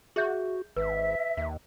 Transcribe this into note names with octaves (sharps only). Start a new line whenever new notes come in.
F#4 G#4 E5 G6
G#1 B4 E5
D#2